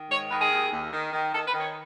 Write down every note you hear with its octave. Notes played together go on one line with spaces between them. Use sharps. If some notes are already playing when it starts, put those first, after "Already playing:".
Already playing: D#3
G#2 C#5
D#3 B4
G#4
D#2
D#2
D#3
D#3
D#3 A4
B4
D#3
C#5